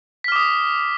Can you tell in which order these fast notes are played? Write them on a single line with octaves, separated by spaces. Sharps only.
B6 F6 D6 D#6